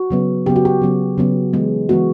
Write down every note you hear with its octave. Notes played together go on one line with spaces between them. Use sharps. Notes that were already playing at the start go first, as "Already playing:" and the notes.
Already playing: F#4
C#3 F#3 B3
C#3 F#3 B3 G4
F#4
G4
C#3 F#3 B3
C#3 F#3 B3
E3 G#3 B3
E3 G#3 B3 F#4